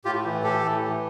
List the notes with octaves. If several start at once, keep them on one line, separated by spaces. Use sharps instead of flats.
A2 F4 G4
E3
A2 G4 A4
E3
E3